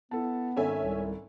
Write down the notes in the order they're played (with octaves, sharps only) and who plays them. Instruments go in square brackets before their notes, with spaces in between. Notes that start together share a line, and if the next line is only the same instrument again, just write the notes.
[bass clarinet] B3 [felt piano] E4 A4 A5
[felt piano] G#1 [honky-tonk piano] C#4 E5 G#5 [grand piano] A4
[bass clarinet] C2